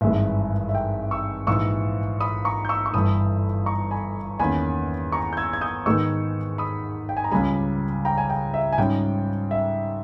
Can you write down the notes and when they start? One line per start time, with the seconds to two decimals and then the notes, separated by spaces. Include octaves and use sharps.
0.01 G#1 G2 E3 G#3 E5
0.69 E5
0.75 G5
1.11 C#6 E6
1.47 A#1 G#2 E3 C#6 E6
2.21 B5 D#6
2.45 A#5 C#6
2.65 G6
2.69 C#6 E6
2.86 C#6
2.94 G1 G2 E3 B5 D#6
3.66 A#5 C#6
3.91 G#5 B5
4.39 E2 D#3 A#3 C#4 G#5 B5
5.12 A#5 C#6
5.33 G6
5.37 E6 G#6
5.53 G#6
5.61 D#6 G6
5.86 G#2 D#3 G#3 B3 D#4 C#6 E6
6.58 B5 D#6
7.09 G5
7.17 G#5
7.24 A#5
7.32 C#2 C#3 G3 G#5 B5
8.05 G5 A#5
8.18 G#5
8.30 G5
8.54 E5
8.73 G#5
8.78 G#2 G3 C#4 G5
9.51 E5